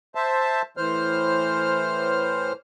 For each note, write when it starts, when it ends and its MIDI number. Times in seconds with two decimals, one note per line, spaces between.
0.15 0.62 72
0.15 0.62 76
0.15 0.62 81
0.77 2.53 45
0.77 2.53 52
0.77 2.53 72
0.77 2.53 89